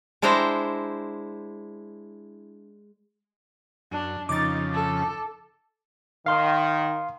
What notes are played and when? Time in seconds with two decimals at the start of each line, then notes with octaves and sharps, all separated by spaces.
0.22 G#3 D4 E4 C5 G5 A#5
3.92 F#2 D4
4.29 F2 C#3 D#4 D6 A6
4.73 A4
6.26 D#3 F5 C6